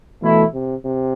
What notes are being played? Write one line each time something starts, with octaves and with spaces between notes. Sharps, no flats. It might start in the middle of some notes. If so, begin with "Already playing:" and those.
B2 E3 A3 E4
C3
C3